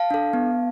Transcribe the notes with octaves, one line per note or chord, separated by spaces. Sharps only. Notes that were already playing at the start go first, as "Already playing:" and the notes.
Already playing: F5 A5
D4 A4
B3